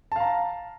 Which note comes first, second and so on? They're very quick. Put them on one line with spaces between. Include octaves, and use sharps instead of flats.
A5 F5 A#5